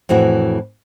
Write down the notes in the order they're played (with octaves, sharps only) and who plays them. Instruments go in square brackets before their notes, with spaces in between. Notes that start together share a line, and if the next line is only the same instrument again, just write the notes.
[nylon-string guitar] F2 A2 E3 F#4